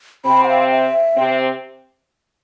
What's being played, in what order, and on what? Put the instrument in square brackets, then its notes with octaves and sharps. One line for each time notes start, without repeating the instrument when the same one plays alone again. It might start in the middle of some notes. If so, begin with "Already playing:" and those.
[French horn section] C3 C4 [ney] B5
[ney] F#5
F5
E5
[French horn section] C3 C4